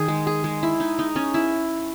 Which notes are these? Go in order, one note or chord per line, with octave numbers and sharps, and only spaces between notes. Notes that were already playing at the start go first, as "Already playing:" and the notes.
Already playing: D#3 G#4
G#3
G#4
G#3
E4
D#4
D#4
C#4
E4